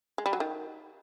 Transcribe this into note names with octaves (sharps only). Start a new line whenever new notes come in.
G#3
G3
F#3
D#3